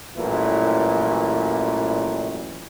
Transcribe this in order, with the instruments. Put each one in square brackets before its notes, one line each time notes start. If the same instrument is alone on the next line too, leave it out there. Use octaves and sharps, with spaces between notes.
[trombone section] A1 F#2 A#2 E3 G3 A3